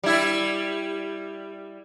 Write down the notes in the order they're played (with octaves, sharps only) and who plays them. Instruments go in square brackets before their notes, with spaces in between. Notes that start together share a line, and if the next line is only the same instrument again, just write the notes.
[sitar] G3 E4